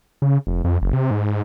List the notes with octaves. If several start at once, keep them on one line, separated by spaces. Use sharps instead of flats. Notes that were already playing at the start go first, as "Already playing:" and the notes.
C#3
F1
F2
F#1
C3
G#2